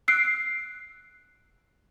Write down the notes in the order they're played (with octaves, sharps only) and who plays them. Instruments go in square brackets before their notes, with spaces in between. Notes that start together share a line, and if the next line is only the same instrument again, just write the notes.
[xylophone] E6 F#6 C7 D7